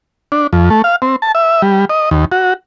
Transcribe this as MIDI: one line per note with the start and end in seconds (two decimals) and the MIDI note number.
0.32 0.47 62
0.53 0.69 41
0.70 0.82 57
0.84 0.96 77
1.02 1.16 60
1.22 1.32 81
1.35 1.62 76
1.62 1.85 55
1.90 2.10 75
2.11 2.25 39
2.32 2.54 66